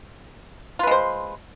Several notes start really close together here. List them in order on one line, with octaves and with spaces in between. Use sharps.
F4 B4 G#3 C5